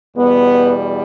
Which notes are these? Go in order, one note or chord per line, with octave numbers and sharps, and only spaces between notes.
E2 B2 G3 B3